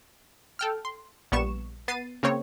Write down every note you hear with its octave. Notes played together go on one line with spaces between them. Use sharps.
A4 G5 F6
C6
A#1 G3 B3 C#6 E7
B3 A6 C7 D#7
C#3 A#3 C4 C#5